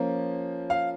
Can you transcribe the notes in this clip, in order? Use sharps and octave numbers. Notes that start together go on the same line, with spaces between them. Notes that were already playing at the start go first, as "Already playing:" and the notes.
Already playing: F3 A#3 C#4
F5